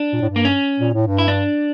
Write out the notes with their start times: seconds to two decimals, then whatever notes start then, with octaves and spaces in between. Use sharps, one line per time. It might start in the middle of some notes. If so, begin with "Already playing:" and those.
Already playing: D4
0.13 A#2
0.21 A2
0.30 G2
0.36 A#3
0.45 C#4
0.80 A#2
0.94 A2
1.07 G2
1.18 E4
1.28 D4